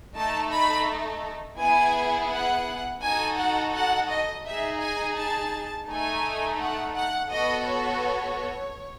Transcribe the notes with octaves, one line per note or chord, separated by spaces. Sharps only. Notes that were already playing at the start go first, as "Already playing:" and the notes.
A3 D#4 A4 A5
B5
B3 E4 G#4 G#5
F#5
D#4 F#4 A4 G#5
F#5
F#5
D#5
D#4 G#4 E5
G#5
A5
A3 D#4 A4 G#5
F#5
F#5
B3 F#4 A4 D#5
C#5